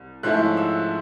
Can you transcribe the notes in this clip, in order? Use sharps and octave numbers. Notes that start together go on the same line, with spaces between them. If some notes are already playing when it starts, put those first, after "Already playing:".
Already playing: C2
G#2 F3 A3 C#4 E4 F#6
E6